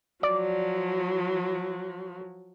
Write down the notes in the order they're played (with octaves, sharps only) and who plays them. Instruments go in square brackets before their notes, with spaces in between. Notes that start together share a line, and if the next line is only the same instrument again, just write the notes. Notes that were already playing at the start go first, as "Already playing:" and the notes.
[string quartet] F3 F#3 [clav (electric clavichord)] D5